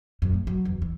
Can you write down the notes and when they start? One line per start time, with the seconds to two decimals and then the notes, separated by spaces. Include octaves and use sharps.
0.22 A#1 F#2
0.34 A3
0.47 F#3
0.65 F#1 E2
0.82 E3